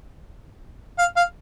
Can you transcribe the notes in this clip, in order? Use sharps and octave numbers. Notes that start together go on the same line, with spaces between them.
F5
F5